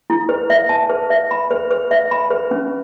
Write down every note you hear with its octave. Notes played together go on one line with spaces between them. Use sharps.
E4
B4
E5
A5
B4
E5
B5
B4
B4
E5
B5
B4
C#4